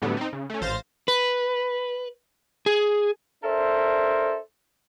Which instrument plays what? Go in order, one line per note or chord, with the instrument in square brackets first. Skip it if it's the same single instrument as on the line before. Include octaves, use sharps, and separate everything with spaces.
[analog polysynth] A2 D3 F#3 G3 B3
C4 D#4
C#3
A3 C#4
A1 C5 F5 A6 A#6
[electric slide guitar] B4
G#4
[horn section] D4 A4 A#4 C5 E5